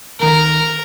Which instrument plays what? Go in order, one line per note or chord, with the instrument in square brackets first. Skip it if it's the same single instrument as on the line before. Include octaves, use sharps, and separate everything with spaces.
[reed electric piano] C#2 D#3 [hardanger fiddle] A#4